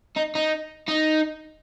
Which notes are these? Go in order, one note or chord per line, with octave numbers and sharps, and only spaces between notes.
D#4
D#4
D#4